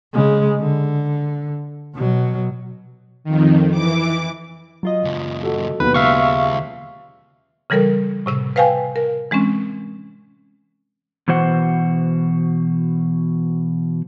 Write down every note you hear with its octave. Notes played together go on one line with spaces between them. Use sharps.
C#3 G#3
D3
B2 F#3
F2 D#3
E3 D6
F#3 F4 D#5
C#2 F#2
F#4 A4
D#2 B2 D#3 F#3 B4
C#2 E5 F5 C#6
C#3 E3 G3 A4 A#4
A2 C3 E6
B4 C5 F5 G5 G#5
A#4
E3 G#3 C4 C#4
B2 E3 F#4 C5 F#5